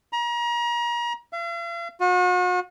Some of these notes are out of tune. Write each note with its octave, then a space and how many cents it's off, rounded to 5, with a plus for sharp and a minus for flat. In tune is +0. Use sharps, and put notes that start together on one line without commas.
A#5 +35
F5 -45
F#4 -40